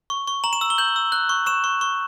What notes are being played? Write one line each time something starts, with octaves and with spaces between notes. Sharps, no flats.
C#6
C#6
A#5 F#7
E7
E6
G7
G6 F#7
E6
F#6
C#6
C#6 E7
C#6
C#6